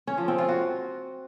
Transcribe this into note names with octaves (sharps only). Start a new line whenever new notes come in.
C#4
F3
C4
F4
F#4